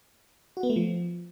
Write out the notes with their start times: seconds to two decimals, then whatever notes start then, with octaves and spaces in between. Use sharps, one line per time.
0.57 F#4
0.63 B3
0.70 A3
0.76 F3